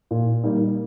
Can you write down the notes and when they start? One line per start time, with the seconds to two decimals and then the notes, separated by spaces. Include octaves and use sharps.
0.11 A#2
0.44 G3 A#3 D#4